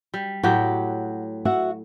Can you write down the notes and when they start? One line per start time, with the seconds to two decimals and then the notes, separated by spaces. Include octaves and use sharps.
0.14 G3
0.43 A2 F#3 G4 F#5
1.45 F#4 E5 F#5